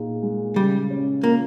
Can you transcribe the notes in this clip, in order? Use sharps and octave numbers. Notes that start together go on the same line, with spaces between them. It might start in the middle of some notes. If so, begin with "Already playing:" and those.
Already playing: A#2 D#4 G#4
G#3
C#3 G3
C#4
A#3 F4